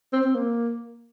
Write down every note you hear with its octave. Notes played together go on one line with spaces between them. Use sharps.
C4
C4
A#3